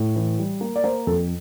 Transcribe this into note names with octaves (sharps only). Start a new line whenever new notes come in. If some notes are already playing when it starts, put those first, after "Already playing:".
Already playing: A2
E3
G3
A#3
D5
A#3 C5
F2 A4